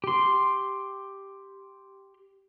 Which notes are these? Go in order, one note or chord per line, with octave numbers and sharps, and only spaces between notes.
G4 C6